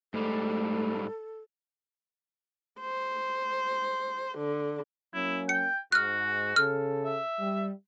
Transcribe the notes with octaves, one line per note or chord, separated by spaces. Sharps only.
G#2 G3 A3 A4
C5
D3
F#3 A#3 C#4 E4
G5 C#7
G#2 F#4 F6 F#6
C#3 A4 F6
E5
G3